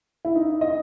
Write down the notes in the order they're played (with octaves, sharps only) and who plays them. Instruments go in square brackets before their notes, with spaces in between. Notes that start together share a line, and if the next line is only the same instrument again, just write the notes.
[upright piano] E4
D#4
D#5